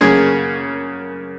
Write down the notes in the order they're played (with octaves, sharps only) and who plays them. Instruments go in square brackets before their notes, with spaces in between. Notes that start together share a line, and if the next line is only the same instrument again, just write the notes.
[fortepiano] F#2 C#3 A#3 C#4 G#4